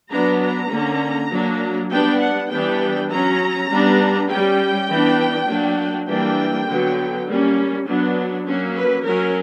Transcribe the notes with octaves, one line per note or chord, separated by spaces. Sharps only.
F#3 B3 D4 A#5
A#5
D3 A#3 C#4
F#3 A#3 D4
G3 B3 D4 G5
F#5
E3 G3 B3 D4 G5
F#3 C#4 A#5
G3 B3 D4
G3 C#4 G5
E3 B3 D4
F#3 A#3 D4
E3 G3 A#3 D4 G5
D3 F#3 B3
G3 A#3 C#4
F#3 B3 D4
F#3 A#3 C#4
B4
F#3 C#4 A#4